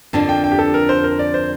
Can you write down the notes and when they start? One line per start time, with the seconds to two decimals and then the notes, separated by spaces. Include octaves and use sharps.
0.13 F2 D3 F3 A#3 D4 A5
0.29 G5
0.44 G5
0.52 G4
0.59 A4
0.74 A#4
0.89 C5
1.04 A#4
1.19 D5
1.34 C5